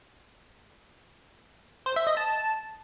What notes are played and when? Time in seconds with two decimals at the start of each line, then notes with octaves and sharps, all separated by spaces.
1.86 C5
1.96 E5
2.07 D#5
2.17 A5